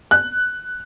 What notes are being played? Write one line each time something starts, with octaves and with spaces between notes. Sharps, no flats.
F#6